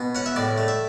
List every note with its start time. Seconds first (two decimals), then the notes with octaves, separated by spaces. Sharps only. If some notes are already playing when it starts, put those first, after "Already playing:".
Already playing: B2
0.15 C#4 F#5
0.26 E5
0.36 A2 D5
0.58 A3
0.68 E5